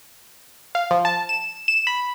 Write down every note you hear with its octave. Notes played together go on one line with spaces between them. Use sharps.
F5
F3
A5
E7
E7
B5